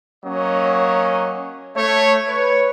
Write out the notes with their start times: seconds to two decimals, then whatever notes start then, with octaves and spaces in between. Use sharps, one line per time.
0.24 F#3 A#3 C#4 D#5
1.76 A3 C#5
2.27 B4 C#5